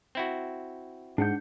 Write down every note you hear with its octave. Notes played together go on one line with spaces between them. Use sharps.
C4 E4 F#4
G#2 D4 F#5 G6